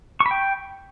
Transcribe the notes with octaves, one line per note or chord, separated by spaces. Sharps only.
C#6
B5
G5